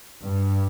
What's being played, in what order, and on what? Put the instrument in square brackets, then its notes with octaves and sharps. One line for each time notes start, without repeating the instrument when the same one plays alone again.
[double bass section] G2